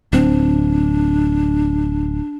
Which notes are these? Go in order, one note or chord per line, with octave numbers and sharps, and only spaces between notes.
D1 C4 D4